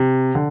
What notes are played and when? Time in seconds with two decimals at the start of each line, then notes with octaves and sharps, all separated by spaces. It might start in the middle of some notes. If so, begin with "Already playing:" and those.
Already playing: C3
0.35 D3